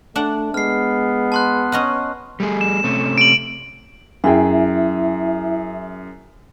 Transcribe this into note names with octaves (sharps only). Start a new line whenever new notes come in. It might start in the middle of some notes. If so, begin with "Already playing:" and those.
A3 D4 F#5
G#3 B3 F6 C7
A5 C6 F#6
C#4 D#5 F#5
G3 A3 G#4
E7
C3 A3 C#4
D7 F#7
F#2 E4 G#4 E5 G5